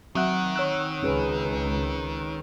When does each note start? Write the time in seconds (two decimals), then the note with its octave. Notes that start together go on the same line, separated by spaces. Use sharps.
0.15 D#3 F#3 C4 E5 F#5 F#6
0.56 C#5 E6 F#6
1.03 C#2 C#4 G#4 B4